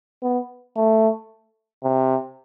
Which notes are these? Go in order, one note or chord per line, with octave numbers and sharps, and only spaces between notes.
B3
A3
C3